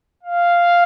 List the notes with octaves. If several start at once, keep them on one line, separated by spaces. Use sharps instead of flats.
F5